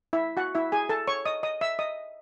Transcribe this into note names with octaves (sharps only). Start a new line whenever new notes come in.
E4 E5
F#4 F#5
E4 E5
G#4 G#5
A4 A5
C#5 C#6
D#5 D#6
D#5 D#6
E5 E6
D#5 D#6